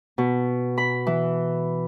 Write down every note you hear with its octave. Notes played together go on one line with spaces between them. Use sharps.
B2
B5
E3